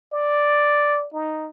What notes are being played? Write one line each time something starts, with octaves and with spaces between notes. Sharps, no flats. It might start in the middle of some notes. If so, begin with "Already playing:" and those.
D5
D#4